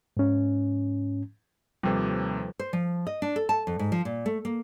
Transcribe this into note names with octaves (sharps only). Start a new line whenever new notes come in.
G#2 C#4
D#2 C3 F3 G3 A4 B4
C5
F3
D#5
D4
A4
A5
F2
G#2
F3
A#2
A3
A#3